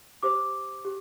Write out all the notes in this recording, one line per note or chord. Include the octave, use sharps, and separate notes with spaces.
G4 C5 D6
G4